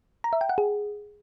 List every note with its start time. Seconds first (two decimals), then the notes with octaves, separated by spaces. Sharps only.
0.24 A#5
0.33 E5
0.41 G5
0.49 F#5
0.58 G#4